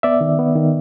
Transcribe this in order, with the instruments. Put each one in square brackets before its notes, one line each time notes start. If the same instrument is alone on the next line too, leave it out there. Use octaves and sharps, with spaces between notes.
[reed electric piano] B3 D5 E5
D#3
B3
D#3